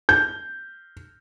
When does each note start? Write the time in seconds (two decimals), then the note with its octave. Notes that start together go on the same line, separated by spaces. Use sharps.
0.09 G6